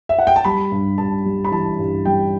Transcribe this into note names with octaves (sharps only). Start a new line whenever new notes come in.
E5
F#5
G5
A5
G3 B5
G2
G2 A5
G3
B5
E3 A5
G2
G3 G5